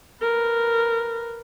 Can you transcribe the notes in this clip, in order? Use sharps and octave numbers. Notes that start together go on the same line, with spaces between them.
A#4 B4